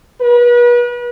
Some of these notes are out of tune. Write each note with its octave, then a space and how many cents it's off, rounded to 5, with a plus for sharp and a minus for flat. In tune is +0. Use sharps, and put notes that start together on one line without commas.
B4 -40